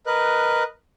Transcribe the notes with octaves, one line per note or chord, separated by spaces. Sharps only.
A#4 B4 D#5 F#6